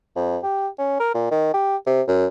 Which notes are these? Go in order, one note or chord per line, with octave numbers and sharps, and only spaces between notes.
F2
G4
C#4
A#4
A#2
D#3
G4
C3
F#2